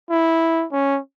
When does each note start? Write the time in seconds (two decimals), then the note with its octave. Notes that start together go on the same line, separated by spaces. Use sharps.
0.10 E4
0.72 C#4